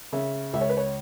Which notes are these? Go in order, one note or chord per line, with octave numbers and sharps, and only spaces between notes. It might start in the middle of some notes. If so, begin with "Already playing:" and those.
C#3 E5
C#2 E5
C#5
B4
C#5